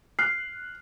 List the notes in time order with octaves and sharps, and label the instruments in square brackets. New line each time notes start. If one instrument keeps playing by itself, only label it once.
[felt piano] F6 F#6 [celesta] C7